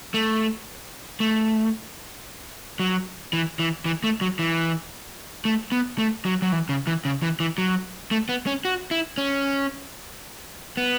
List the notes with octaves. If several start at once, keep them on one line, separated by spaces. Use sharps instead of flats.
A3
A3
F#3
E3
E3
E3
A3
F#3
E3
A3
B3
A3
F#3
F#3
E3
C#3
E3
C#3
E3
E3
F#3
A3
B3
C#4
F#4
E4
C#4
B3